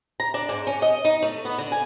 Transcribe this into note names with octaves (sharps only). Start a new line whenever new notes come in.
A#5
D4
G#2
C#4
D#5
D#4
A3
B3
D3
G#5